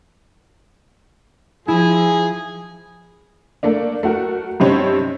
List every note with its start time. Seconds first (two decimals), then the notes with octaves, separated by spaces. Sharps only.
1.68 F3 E4 G#4
3.63 A3 A#3 D4
4.03 A3 F#4 A#4
4.60 G2 C3 C4 C#4 D#4